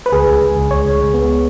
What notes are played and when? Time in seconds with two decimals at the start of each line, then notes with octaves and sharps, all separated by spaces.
0.06 B4
0.12 C#2 G#4
0.27 C#2
0.42 C#2
0.56 C#2
0.71 C#2 C#5
0.85 C#2
1.00 C#2
1.14 B3